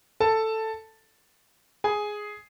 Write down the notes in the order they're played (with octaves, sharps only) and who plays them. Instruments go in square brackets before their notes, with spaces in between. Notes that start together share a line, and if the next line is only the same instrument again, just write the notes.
[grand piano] A4 A5
G#4 G#5